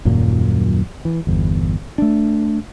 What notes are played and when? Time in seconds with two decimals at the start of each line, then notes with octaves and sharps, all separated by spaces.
0.05 D#1 F#2 A#2 F#3
1.05 E3
1.27 G1 E2
1.98 A3 D4